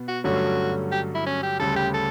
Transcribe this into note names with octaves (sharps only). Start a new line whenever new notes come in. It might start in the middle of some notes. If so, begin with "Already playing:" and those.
Already playing: B2 B3
F#4
G2 D3 F#3 A3 C#4 F#4
G4
E4
C#4
G4
D2 C#3 G3 A4
G4
A4